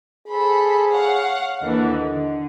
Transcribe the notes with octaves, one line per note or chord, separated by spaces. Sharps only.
G#4 A4 C5 B5
C#5 F5 F#5
D#2 D3 E3 D#5
D3